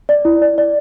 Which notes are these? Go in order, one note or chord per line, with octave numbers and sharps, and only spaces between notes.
D5
E4
D5
D5